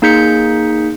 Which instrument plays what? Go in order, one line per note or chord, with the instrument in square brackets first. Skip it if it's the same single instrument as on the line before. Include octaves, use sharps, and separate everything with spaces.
[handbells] A#3 D#4 G#4 G6 B6 C#7